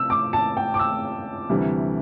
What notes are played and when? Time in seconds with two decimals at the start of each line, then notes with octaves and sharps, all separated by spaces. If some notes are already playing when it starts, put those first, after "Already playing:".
Already playing: C3 E6
0.10 D6
0.33 A5
0.57 G5
0.74 D6
0.79 E6
1.50 D2 C3 E3 G3